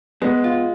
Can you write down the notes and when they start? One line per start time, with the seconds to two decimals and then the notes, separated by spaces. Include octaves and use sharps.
0.22 G#3 B3
0.44 F4